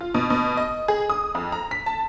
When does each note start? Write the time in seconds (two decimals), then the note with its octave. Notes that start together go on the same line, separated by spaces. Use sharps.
0.01 F4
0.14 B2
0.30 B2
0.57 D#5
0.88 G#4
1.10 D#6
1.35 F2
1.52 A#5
1.71 B6
1.86 A5